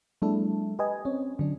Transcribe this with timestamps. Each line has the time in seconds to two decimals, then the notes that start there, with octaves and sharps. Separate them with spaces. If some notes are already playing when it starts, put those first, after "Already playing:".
0.22 F#3 G#3 A#3 D4 E4 A4
0.79 G4 B4 D#5 G#5
1.05 C4 C#4 C#5
1.39 D3 F#3 D4